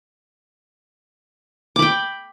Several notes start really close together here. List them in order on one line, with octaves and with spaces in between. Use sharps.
D6 B5 G5